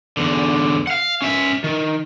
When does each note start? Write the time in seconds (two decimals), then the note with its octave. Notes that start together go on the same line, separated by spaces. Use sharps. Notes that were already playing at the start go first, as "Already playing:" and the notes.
0.17 E2 D3
0.87 F5 F#5
1.22 C#4 E5
1.64 D#3